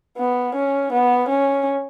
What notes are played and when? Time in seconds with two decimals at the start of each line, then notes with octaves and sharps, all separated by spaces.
0.18 B3
0.55 C#4
0.92 B3
1.28 C#4